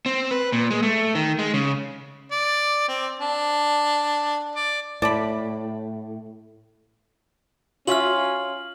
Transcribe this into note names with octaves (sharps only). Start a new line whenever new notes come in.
C4
B4
A#2
G#3
A3
D#3
G#3
C#3
D5
C4
D4
D5
A2 D5 A5 B5
C#4 F4 F#4 E5 F6 F#7